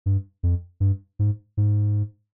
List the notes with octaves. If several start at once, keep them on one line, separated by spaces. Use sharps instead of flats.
G2
F2
G2
G#2
G#2